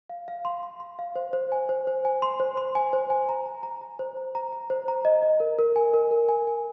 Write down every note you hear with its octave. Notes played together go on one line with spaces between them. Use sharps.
F5
F5
C6
C6
C6
F5
C5
C5
G#5
C5
C5
G#5
C6
C5
C6
G#5
C5
G#5
A#5
A#5
A#5
A#5
C5
A#5
A#5
A#5
C5
A#5
D#5
D#5
A#4
A#4
G#5
A#4
A#4
G#5
G#5